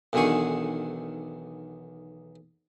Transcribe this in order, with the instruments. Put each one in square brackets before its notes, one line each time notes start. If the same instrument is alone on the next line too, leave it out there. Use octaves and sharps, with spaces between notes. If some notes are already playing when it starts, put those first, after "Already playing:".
[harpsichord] B1 E2 D3 D#3 G#4 C#6